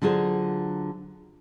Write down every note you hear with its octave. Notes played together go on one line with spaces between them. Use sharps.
D3 F#3 F4 G#4 C5